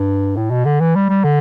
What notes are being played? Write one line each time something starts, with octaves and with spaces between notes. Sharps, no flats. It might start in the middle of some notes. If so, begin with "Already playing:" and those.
Already playing: G2
A2
B2
D3
E3
G3
G3
D3